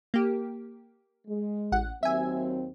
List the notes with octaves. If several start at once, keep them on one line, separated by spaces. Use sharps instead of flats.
A#3 G4
G#3
A1 F#5
D#2 F#3 C4 E5 G#5